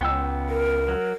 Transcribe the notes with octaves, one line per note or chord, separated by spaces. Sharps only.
C#2 B3 G5 E6
A#4
F#3